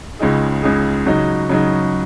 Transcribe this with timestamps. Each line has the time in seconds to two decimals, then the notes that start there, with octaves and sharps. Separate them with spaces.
0.19 C#2 C#3 G#3 D#4 G#4
0.63 C#2 C#3 G#3 D#4 G#4
1.06 C#3 F#3 D#4
1.49 C#3 F#3 D#4